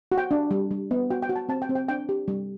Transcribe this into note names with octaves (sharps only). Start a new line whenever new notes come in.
F#4
G5
D4
G3
G3
B3
F#4 G5
G5
F#4
A5
C4 A5
G5
C4
G5
D4 G5
G4
G3